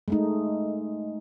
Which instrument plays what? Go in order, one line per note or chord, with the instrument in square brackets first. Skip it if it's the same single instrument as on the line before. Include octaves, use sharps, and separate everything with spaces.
[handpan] G#3 A3 D#4